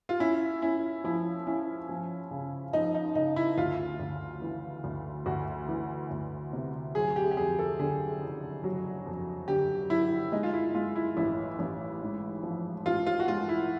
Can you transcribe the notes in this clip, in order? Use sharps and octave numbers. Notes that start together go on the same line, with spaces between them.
F4
C#4 E4
C#4 E4
F3 E4
C#4 E4
F3
C#3
F3 D#4
D#4
C#3 D#4
E4
D2 F4
D2
E3
D2
D2 F#4
E3
D2
C3
F#3 G#4
G4
G4
F2 G#4
A4
D3 G#4
F#1
F#3
F2
D3 G4
F#3 E4
G#3 D#4
F4
E4
G#3 F4
E4
A1 E4
A1
G#2
F3
A1 F4
F4
F#4
G#3 F4
E4